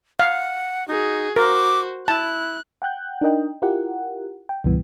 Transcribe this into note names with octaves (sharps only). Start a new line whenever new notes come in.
F5 F#5
D#4 F#4 G#4
F#4 A#4 C5 D6
E4 A5 F#6
F#5 G5 F#6 G6
D4 D#4 A#4 D#5 G5
E4 F4 G4 A#4 F#5
G5
C#2 G#2 B2 E3 G3 B3